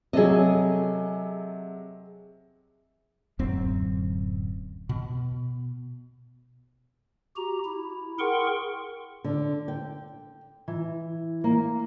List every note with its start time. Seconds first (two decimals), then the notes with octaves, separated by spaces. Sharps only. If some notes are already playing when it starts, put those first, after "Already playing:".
0.13 C3 F#3 G#4 A4 D#5
3.39 D1 F#2 C4
4.89 B2
7.36 F#4 G4 A#5
7.65 E4
8.19 G#4 A#4 F#5 G5 C6 C#6
9.24 D3
9.68 G5
10.68 E3
11.44 A#3